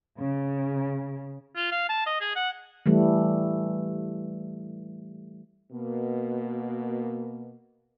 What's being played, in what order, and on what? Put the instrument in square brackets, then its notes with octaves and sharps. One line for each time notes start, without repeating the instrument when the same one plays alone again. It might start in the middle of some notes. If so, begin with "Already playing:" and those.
[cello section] C#3
[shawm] F4
F5
A5
D#5
G#4
F#5
[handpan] E3 G3 A3
[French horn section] B2 A#3